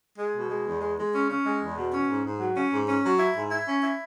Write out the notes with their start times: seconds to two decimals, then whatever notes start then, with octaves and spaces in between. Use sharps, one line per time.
0.19 G#3
0.34 B2
0.49 G#3
0.66 E2
0.82 G#3
0.97 G#3
1.14 C#4
1.29 C#4
1.45 G#3
1.61 E2
1.76 B2
1.93 C#4
2.08 G#2
2.24 G#2
2.40 F#3
2.56 C#4
2.71 G#2
2.87 C#4
3.03 F#3
3.19 E4
3.34 G#2
3.51 E4
3.66 C#4
3.82 E4